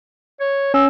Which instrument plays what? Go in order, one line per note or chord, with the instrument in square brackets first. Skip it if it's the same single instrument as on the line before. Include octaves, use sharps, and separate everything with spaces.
[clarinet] C#5
[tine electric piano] C#4 [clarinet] E6